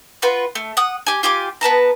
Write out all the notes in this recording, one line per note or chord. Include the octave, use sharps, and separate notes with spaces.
F4 F#4 B4
A3
F#5 D#6
G4 G#5
F4 G4 G#5 D6
B3 B4 A5 A#5